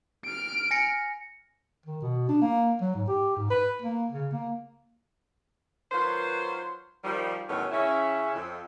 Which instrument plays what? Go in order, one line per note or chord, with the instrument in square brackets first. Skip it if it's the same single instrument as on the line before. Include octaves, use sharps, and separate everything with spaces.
[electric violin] F6 D7
[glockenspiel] G#5 A#6 C#7
[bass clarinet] D#3
B2
D4
A#3
F#3
G#2
G4
G#2
B4
A#3
C#3
A#3
[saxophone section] D#3 F#3 F4 B4 C5
D#3 F3 G3
E2 A2 D#3 F#3 B3 C#4
C#3 C#4 E4
F2